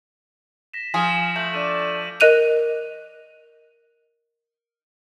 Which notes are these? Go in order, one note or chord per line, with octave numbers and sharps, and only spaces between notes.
A#6 B6 E7
F3 G#4
A3 G6 B6 F#7
D4 A4 D5 D#7
A#4 D#5 F#6 D#7 F7